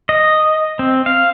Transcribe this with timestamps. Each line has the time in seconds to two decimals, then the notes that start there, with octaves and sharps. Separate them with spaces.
0.09 D#5
0.79 C4
1.06 F5